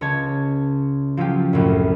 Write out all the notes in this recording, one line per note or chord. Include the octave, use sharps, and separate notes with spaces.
C#2 C#5 A5 G#6
F3 F#3 C#4 F4 G4
C2 F#2 A2